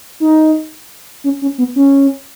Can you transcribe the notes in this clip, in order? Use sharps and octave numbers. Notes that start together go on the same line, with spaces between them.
D#4
C#4
C#4
B3
C#4